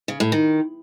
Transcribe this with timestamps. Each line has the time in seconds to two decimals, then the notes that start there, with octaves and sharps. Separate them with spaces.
0.08 C#3
0.20 A2
0.32 D#3